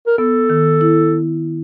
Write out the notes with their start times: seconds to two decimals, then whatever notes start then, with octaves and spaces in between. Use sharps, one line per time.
0.07 A#4
0.18 B3 A4
0.50 D#3
0.81 E4